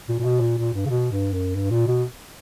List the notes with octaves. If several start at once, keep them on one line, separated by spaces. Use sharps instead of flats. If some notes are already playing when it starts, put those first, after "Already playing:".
A#2
A#2
B2
A#2
A#2
G2
C#3
B2
G2
F#2
G2
A#2
B2